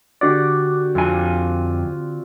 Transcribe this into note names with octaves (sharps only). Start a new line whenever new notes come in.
D3 F#4 G4 D5
F2 C4 F4 G#5